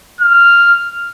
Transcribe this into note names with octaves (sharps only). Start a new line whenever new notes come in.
F6